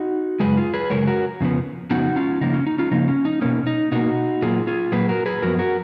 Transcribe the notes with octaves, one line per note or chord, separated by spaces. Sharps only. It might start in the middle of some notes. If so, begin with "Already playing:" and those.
Already playing: D#4 F#4
F#2 C#3 G#3 G#4 B4
F4 G#4
G#4 B4
F#2 C#3 G#3 A#4 C#5
F#4 A#4
F2 C#3 F3 B3
F2 C#3 F3 B3 D#4 F#4
C#4 F4
C#3 F3 A#3 D#4
C#4
D#4
C#4 F4
C#3 F3 A#3 D#4
C#4
D#4
B2 A#3 C#4
D#4
B2 A#3 D#4 F#4
A#2 F#3 A#3 F4 G#4
F4 G#4
A#2 F#3 A#3 G#4 B4
F#4 A#4
G#4 B4
F#2 F3 B3 F#4 A#4
F#4 A#4